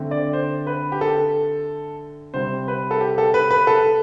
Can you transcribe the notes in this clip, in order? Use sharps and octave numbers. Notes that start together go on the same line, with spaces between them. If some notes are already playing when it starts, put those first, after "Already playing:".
Already playing: D3 A3 C4
D5
C5
B4
G4
A4
C3 G3 C4 C5
B4
A4
G4
A4
B4
B4
A4